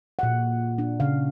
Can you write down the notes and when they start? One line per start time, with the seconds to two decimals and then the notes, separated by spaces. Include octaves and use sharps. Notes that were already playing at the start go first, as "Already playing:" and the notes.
0.19 A#2 F#5
0.78 D4
1.00 C#3 F5